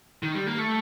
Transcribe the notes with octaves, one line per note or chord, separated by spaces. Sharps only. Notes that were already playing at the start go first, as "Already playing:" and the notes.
D#3
G3
A#3
A3